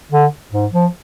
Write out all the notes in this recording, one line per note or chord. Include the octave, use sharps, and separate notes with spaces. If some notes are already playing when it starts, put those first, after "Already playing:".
D3
G#2
F3